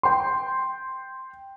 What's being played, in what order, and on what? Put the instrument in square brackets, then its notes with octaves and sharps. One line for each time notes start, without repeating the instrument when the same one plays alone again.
[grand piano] G5 C6